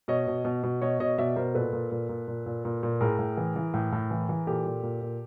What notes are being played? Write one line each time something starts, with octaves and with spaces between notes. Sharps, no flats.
B2 C#5 D#5
B2
B2
B2
B2 C#5 D#5
B2 C#5 D#5
B2 D5 E5
B2 A#4 C5
A#2 A4 B4
A#2
A#2
A#2
A#2
A#2
A#2
A#2
A2 G#4 A#4
A2
E3
E3
A2
A2
E3
E3
A#2 G4 A4
A#2
A#2
A#2